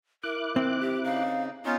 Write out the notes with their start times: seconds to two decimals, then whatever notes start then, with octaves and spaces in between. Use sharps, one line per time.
0.23 E4 A#4 D6 F#6
0.56 D#3 C4
0.80 G4
1.04 C#3 D#4 F5
1.65 B3 C#4 D#4 F4